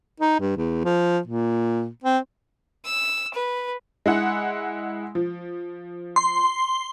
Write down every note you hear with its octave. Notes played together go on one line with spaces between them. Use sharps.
D#4
G2
E2
F3
A#2
C4
E6
B4
G#3 E4 F#5
F3
C6